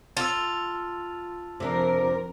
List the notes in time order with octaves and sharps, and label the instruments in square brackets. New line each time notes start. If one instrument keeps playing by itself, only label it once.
[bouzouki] F4 [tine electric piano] A5 E6
[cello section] F2 A#4 [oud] C3 D4